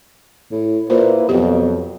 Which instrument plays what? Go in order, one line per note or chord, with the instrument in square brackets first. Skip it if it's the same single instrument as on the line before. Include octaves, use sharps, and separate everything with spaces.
[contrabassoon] A2
[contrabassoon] A#2 [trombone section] A#3 E4 B4 [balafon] C5
[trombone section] F2 F#3 [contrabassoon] B2 [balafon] G4